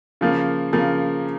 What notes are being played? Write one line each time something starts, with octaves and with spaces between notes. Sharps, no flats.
C#3 F3 A#3
C#3 F3 A#3